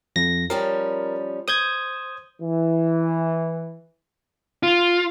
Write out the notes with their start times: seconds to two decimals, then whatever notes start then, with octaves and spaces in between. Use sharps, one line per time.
0.16 F2 A#6
0.50 F3 G3 C#4 A#4
1.48 C5 D#6 G6 G#6
2.41 E3
4.63 F4